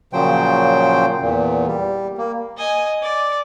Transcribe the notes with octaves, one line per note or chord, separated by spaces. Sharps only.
A#2 C#3 F3 F#3 C5 G5
E2 A#2
G3
A#3
D#5 G#5
D5